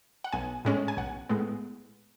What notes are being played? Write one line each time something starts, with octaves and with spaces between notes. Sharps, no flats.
F#5
B1 G#5
A2 G#3 C#4
G#5
B1 F#5
A2 G#3 B3